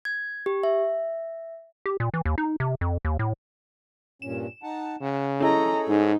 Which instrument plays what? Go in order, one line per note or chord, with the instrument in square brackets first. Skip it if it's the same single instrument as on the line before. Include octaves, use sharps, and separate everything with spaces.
[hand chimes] G#6
G4
E5
[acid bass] G4
A#2
E3
D#2
D#4
C3
F2
D#2
A2
[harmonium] G2 A#2 C#4 [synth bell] E7
[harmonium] D#4 F#5 A5
[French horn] C#3 [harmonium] F#5
[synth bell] C#4 E4 [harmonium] G#4 A4 C#5 [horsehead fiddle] D#5 A#5
[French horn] G#2 [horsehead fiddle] D#4